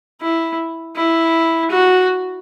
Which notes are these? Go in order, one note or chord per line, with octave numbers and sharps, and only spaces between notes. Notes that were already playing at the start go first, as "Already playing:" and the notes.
E4
E4
F#4